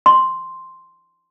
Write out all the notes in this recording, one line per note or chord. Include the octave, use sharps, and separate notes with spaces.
C6